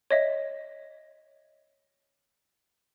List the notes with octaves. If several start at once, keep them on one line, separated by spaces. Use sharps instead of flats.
C#5 D#5 E5